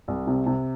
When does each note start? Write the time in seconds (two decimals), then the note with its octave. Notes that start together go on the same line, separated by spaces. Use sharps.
0.08 C2
0.27 C3
0.46 C3